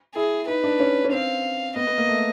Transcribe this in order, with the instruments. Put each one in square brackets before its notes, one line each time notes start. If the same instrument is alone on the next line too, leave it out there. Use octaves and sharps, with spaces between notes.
[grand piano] E4 [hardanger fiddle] G#4
[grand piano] D#4 [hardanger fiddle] B4
[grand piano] D4
C#4
C#4
[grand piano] C4 [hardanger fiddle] F5
[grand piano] B3 [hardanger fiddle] D#5
[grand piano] B3
A#3
A3